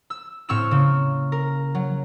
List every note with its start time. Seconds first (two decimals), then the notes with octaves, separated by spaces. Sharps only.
0.10 E6
0.49 A2 C4 C#6 E6 F6 E7
0.71 C#3 A#3
1.32 A#4
1.75 F#3